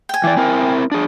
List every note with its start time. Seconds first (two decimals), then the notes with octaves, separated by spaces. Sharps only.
0.09 G5 G#5
0.24 E3 D5
0.37 C4 E4 A#4
0.92 D4 G#4